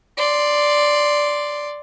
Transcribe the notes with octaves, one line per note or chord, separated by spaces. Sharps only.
D5 C6